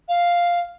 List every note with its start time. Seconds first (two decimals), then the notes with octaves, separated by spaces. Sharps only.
0.08 F5